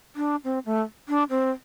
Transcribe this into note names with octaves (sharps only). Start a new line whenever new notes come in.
D4
C4
A3
D4
C4